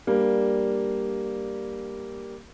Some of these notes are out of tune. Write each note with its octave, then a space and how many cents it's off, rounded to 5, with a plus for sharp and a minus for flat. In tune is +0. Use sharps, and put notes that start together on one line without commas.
G3 +0 A#3 +0 D4 +0